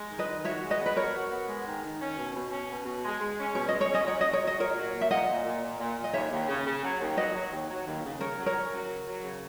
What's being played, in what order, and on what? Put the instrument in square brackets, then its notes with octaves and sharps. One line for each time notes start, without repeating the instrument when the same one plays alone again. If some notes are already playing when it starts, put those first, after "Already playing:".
Already playing: [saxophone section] G#3
D#3
[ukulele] B4 D#5
[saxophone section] D#3
[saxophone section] F#4 [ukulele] C#5 E5
[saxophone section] G#3
[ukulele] B4 D#5
[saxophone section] B3
[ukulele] B4
[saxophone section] F#4 [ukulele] A#4 C#5
[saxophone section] F#4
B3
G#3
D#3
D#3
C#4
B2
B2
C#4
B2
B2
G#3
G#3
C#4
[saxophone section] B2 [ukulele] C#5
[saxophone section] G#3 [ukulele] D#5
[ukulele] C#5
[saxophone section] C#4
[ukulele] D#5
[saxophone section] F#3 [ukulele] C#5
[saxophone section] A#2 [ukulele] D#5
[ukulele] C#5
[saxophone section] F#3
[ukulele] D#5
[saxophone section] A#2 [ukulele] A#4 C#5
[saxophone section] F#3
A#2
[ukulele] E5
[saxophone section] A#2 [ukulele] D#5 F#5
[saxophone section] A#2
A#2
A#2
A#2
A#2
[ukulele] D#5
[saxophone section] D#2 [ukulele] C#5 E5
[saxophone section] D#2
C#3
C#3
F#3
D#2
[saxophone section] F#3 [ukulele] B4 D#5
[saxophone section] F#3
D#2
F#3
D#2
C#3
[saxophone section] C#3 [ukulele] A#4 C#5
[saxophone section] F#3
[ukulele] A#4 C#5
[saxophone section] C#4
F#3
C#3
F#3
C#3